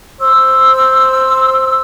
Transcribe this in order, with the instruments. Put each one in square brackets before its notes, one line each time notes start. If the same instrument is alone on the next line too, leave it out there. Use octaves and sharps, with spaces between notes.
[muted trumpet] C5 [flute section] E6